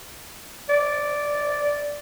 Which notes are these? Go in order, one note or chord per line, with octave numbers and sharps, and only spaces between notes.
D5